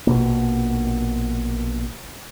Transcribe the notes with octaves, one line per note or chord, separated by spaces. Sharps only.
A#1 B2 A#3